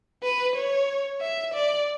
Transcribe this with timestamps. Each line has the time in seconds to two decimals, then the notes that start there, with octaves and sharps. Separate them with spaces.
0.23 B4
0.56 C#5
1.21 E5
1.54 D5